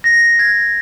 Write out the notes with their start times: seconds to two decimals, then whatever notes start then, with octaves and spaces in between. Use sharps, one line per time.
0.04 A#6
0.39 G#6